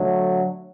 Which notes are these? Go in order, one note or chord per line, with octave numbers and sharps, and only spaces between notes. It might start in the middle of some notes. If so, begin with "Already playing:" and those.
Already playing: D3 F#3 A3